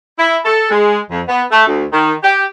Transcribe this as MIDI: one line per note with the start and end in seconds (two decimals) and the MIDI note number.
0.18 0.35 64
0.45 0.68 69
0.70 0.98 56
1.10 1.22 41
1.27 1.42 59
1.51 1.65 57
1.66 1.86 38
1.92 2.12 51
2.23 2.43 67